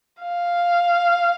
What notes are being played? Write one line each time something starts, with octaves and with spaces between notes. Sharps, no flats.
F5